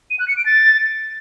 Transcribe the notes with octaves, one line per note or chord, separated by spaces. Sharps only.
D#7
F#6
C#7
D7
A6